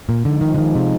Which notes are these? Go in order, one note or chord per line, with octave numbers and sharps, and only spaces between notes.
A#2
D3 F3 G#3 D#4
D#3
D3
D#3
C3